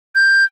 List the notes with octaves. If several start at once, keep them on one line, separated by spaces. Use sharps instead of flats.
G6